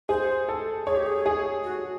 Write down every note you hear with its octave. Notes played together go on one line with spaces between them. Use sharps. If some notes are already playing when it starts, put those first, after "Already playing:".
G#4 C5
A4
G#4 C#5
G4
G#4
G#4
F#4